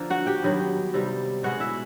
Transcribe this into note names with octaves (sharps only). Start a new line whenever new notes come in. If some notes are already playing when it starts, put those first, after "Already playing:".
Already playing: D3 F3 A#3
F#4 F#5
G4 G5
G2 D#3 F#3 B3
C3 D#3 G3 B3
B2 G#3 B3 F#4 F#5
E4 E5